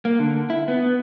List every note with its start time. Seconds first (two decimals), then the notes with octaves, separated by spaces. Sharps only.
0.05 A#3
0.19 D3
0.50 E4
0.68 B3